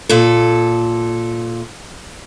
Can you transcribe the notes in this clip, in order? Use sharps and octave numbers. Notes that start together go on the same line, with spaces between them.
A#2 A4